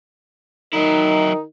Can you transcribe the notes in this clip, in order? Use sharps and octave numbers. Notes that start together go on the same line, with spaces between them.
D#3 F#3 D#4 E4